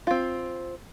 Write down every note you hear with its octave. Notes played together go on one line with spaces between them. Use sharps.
C4 F4